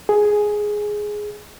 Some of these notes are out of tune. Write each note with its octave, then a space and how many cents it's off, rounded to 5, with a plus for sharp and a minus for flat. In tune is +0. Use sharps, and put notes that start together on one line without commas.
G#4 +5